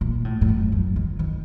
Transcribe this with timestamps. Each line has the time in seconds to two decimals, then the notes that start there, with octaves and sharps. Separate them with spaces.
0.01 A#2
0.25 A2
0.41 A2
0.48 F#2
0.72 F#2
0.96 D#3
1.19 D#3